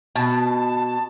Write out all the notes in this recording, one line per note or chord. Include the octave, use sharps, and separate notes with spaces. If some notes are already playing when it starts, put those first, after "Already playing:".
B2 A5